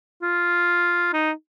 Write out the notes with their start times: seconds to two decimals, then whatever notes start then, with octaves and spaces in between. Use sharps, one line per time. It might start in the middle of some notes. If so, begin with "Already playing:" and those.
0.22 F4
1.13 D#4